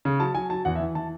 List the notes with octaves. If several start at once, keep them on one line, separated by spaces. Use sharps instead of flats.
C#3
F#3 A5
F#3 G#5
F#3 A5
E2 F#5
E5
E3
E3 A5